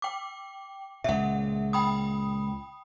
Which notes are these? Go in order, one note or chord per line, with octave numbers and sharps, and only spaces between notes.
G5 D6
C#2 A#2 E5 F#5
G5 B5 D#6